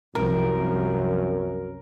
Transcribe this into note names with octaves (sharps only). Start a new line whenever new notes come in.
C2 F#2 F3 A#4